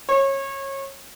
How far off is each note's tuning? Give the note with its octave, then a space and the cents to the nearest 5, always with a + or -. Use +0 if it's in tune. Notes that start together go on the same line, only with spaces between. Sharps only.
C#5 -25